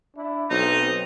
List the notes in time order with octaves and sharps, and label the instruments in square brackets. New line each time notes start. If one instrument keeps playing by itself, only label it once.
[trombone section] D4 E4
[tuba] B1 [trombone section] A3 C4 [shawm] D#4